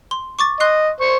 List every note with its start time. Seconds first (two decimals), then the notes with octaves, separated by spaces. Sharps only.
0.11 C6
0.39 C#6 D6 A6
0.60 D#5 C6 F#6 C7
1.01 C5 C#6